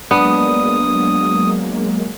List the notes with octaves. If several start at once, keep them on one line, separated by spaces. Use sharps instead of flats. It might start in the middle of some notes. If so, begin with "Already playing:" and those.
F#3 G#3 A#3 B3 D4 D#6